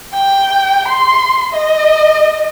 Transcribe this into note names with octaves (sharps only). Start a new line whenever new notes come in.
G5
C6
D#5